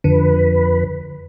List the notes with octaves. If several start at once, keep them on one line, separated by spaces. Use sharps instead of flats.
F2 D3 B4